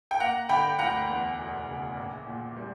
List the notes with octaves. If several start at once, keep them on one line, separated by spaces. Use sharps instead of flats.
G5
A#3 F#5 A#5
D3 G5 B5
D2 F#5 A#5
E2
E1
C#3
A#1
A#2
G3